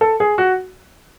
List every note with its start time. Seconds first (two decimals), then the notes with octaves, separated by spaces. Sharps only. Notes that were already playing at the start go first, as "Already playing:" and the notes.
0.01 A4
0.20 G#4
0.38 F#4